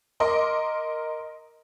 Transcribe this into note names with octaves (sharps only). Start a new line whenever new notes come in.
A#4 D#5 C6 D6